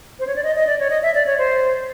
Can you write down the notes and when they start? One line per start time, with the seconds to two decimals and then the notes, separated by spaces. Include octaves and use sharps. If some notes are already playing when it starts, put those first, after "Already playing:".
0.20 C5
0.27 C#5
0.36 D5
0.43 D#5
0.56 D#5
0.67 D5
0.79 C#5
0.90 D#5
1.02 E5
1.15 D5
1.27 C#5
1.38 C5